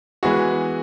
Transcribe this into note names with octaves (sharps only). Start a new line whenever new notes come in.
E3 G#3 B3 E4 F#4 G#4